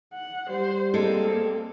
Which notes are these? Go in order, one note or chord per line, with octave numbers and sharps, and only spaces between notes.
F#5
G3 C5
G#3 A#3 C4 A4